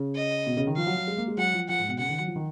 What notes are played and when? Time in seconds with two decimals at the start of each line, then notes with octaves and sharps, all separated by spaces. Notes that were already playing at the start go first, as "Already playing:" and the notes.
Already playing: C#3
0.16 D#5
0.47 B2
0.57 C#3
0.67 D#3
0.77 F3 F5
0.87 F#3
0.97 F#3
1.08 G#3
1.17 A#3
1.28 G#3
1.37 F#3 F#5
1.54 F3
1.69 F3 F#5
1.79 G#2
1.89 B2
1.98 C#3 F#5
2.09 D#3
2.19 F#3
2.27 F3
2.36 D#3